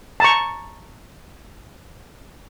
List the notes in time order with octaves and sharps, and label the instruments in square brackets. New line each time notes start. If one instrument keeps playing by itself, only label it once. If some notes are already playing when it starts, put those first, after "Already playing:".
[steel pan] A5 A#5 C#6